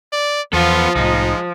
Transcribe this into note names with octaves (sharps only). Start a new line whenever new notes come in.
D5
E2 F3 B3 F4 A4
C2 A2 G#3 D#4